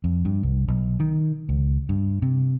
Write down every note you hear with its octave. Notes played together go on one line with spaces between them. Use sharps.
F2
G2
C2
B1
D#3
C#2
G2
C3